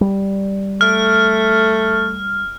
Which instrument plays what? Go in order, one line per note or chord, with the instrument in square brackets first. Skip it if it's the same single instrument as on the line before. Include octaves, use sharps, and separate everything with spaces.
[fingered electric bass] G3
[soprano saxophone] A3 [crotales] F6